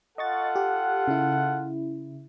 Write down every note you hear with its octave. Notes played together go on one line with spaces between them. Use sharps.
F4 A4 D#5 F#5 C#6 A6
G4
C#3 E4